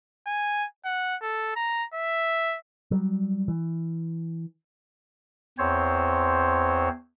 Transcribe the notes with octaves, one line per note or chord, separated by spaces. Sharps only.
G#5
F#5
A4
A#5
E5
F#3 G3
E3
E2 C4 C5 C#5